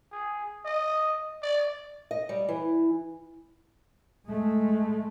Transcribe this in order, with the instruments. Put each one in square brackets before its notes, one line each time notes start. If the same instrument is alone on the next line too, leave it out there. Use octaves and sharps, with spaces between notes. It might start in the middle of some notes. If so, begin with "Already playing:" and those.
[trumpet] G#4
D#5
D5
[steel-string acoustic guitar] D#5
G3
E3
[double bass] G#3 A3